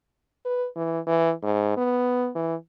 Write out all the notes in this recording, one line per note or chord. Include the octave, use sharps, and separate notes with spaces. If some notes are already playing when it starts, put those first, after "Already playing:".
B4
E3
E3
G#2
B3
E3